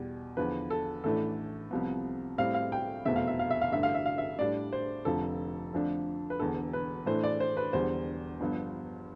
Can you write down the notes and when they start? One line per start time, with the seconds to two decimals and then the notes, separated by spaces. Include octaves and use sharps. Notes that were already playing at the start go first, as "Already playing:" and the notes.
Already playing: E2 B2 G3
0.37 E2 D3 F3 B4
0.70 A4
1.04 A1 A2 E3 A3 D4 A4
1.71 C2 C3 F3 B3
2.38 A2 G3 C4 E4 F5
2.54 F5
2.72 G5
3.06 F1 E2 B2 A3 C4 E5
3.16 F5
3.27 E5
3.39 F5
3.51 E5
3.61 F5
3.72 A1 G2 D3 E5
3.83 F5
3.94 E5
4.06 F5
4.18 E5
4.38 A2 G3 D4 D5
4.73 C5
5.05 F1 F2 D3 F3 A4
5.73 F2 D3 F3 A3 D4
6.30 B4
6.39 E1 E2 D3 A4
6.73 B4
7.06 A2 E3 A3 D4 C5
7.24 D5
7.40 C5
7.57 B4
7.73 E1 E2 D3 G3 C5
8.40 G1 G2 F3 B3